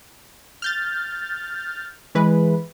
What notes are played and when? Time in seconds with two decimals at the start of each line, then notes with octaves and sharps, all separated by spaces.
0.62 F6 G6 A6
2.15 E3 G#3 B4